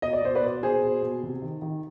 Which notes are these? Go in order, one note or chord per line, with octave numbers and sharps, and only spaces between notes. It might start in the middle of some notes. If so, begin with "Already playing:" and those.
B2 D#5
D5
B2 C5
B4 D5
B2
B2 G#4 C5
B2
B2
C3
D#3
D#3